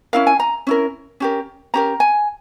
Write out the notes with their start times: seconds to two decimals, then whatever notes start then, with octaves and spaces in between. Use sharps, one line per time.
0.13 C#4 E4 A#4 F5
0.27 G#5
0.40 A#5
0.67 C#4 E4 A#4
1.20 C#4 G4 A#4
1.74 C#4 G4 A#4 A#5
2.00 G#5